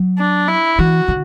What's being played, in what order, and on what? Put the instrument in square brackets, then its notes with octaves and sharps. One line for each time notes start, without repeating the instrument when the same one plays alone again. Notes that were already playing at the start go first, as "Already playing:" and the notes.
Already playing: [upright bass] F#3
[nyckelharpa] D4
E4
[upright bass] E3 [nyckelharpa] F#4
[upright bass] D3